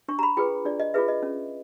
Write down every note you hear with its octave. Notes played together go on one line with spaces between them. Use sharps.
D4 C#6
A#5
B5
F4 G#4 B4 G5
D4 D5
D#5
F4 G#4 B4 E5
D#5
C#4